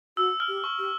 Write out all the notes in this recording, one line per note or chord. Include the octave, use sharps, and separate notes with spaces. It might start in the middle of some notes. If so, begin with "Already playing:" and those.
F#4 E6
F6
G4
C#6
G4